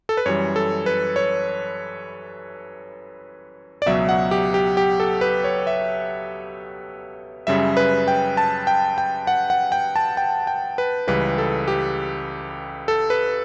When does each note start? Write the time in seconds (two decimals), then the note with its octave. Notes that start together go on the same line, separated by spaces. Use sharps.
0.09 A4
0.17 B4
0.26 F#2 E3 G3 C#5
0.56 A4
0.86 B4
1.16 C#5
3.82 D5
3.86 C#2 B2 F#3 E5
4.09 F#5
4.31 G4
4.54 G4
4.77 G4
5.00 A4
5.21 B4
5.44 C#5
5.67 E5
7.47 F#2 C#3 G3 E5
7.77 B4
8.08 G5
8.37 A5
8.67 G5
8.98 G5
9.27 F#5
9.50 F#5
9.72 G5
9.96 A5
10.17 G5
10.47 G5
10.78 B4
11.07 C#2 C#3 E3 G3 B4
11.38 A4
11.68 G4
12.88 A4
13.10 B4